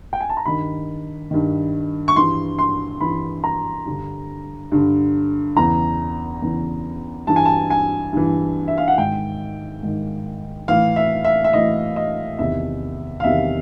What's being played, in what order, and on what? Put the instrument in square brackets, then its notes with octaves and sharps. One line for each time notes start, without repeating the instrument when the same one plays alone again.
[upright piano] G5
G#5
A5
A#5
G2 D#3 B5
G2 D#3
C#6
G2 E3 C6
C6
G2 E3 B5
A#5
G2 D3
G2 D3
E2 C#3 E3 A#5
E2 C#3 E3
G2 E3 A5
G#5
A5
G#5
G2 E3
E5
F5
F#5
G#2 D#3 G5
G#2 D#3
A2 E3 F5
E5
E5
E5
A2 E3 D#5
D#5
E2 C3 D#3 E5
F5
E2 C3 D#3 E5